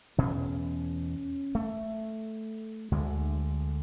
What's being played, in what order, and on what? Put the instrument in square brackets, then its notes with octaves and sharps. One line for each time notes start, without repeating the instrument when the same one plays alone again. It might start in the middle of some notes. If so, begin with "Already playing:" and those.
[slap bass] E2 B2 C#4
A3
D2 D3 G#3